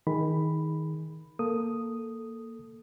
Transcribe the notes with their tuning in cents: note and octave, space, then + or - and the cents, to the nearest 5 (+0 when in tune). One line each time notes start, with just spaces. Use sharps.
D#3 +20 G#4 +0 B5 +5
A#3 -5 A4 +0 D#6 +0